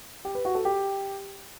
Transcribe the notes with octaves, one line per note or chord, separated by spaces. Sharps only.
G4
B4
F#4
A4
G4